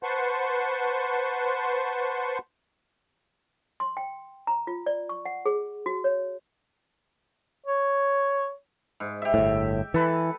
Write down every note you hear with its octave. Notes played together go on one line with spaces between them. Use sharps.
B4 C5 F#5 A5 C6 C#6
C6
G5
A#5
F4
D5
C#6
F#5
G#4
F#4
C#5
C#5
G#2
G4 E5
G1 A2
E3 A4 B4